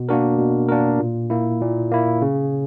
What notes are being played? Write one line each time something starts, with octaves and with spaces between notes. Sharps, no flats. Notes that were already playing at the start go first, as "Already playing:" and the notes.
Already playing: B2
A#3 D4 F#4 A#4
B2
A#3 D4 F#4 A#4
A#2
A#3 E4
A#2
A#3 E4
C#3